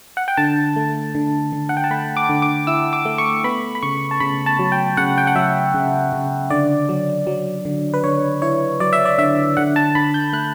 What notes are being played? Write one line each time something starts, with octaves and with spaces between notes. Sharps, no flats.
F#5
G5
D3 A5
A3
D3
D3
F#5
G5
A5
A3 B5
D6
D3
D6
E4 E6
D6
A3
C#6
B3 B5
B5
C#3 C#6
A5
C#3 B5
A5
F#3
G5
C#3 F#5
G5
F#5
F#3 E5
C#3
C#3
D3 D5
F#3
F#3
D3
B4
D3 C#5
E4 C#5
F#3 D5
E5
D5
D3 E5
D3 F#5
A5
D3 B5
G6
A3 F#6